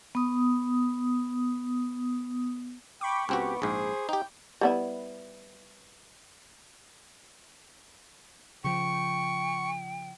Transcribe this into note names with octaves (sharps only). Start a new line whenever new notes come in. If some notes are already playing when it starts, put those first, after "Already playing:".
B3 D#6
G5 B5 C#6 D6
C#2 B3 C4 F#4 G4
A#1 G#2 G#4 C5
D#4 G4 G5
G3 B3 E4
C#3 F3 G5 C#6